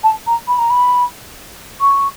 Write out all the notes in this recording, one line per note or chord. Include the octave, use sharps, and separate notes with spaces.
A5
A#5
B5
A#5
B5
C#6